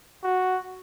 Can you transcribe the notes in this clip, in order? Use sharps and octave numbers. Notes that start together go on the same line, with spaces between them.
F#4